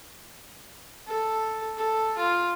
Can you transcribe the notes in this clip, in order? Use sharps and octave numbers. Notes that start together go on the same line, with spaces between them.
A4
A4
F4